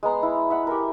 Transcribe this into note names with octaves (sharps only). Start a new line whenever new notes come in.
G#3 B3 A#5 C6
E4
E5 F#5
G4 A#4